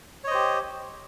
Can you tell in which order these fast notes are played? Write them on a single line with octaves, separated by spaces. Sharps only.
C#5 D#5 C5 G4